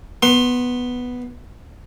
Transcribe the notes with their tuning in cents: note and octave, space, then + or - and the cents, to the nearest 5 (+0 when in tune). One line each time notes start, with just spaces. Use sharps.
B3 +0 C6 +20